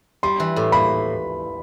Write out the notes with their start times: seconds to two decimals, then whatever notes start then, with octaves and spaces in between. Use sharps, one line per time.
0.23 G3 C6
0.40 E3
0.56 A2
0.72 A#3 B5